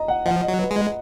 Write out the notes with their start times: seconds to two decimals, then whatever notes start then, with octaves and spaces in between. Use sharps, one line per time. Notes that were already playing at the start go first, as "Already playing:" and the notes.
Already playing: D#5 A#5
0.08 F#5
0.26 F3 F#5
0.43 D#5
0.48 F#3
0.59 B4
0.71 G#3
0.77 D#5